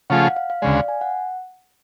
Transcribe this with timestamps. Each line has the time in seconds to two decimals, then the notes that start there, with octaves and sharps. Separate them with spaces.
0.10 C#3 F3 A3 F4 G#4 F#5
0.24 F5
0.36 F5
0.50 F5
0.62 D2 C#3 G#3 D5
0.75 F5
0.88 G#5
1.01 F#5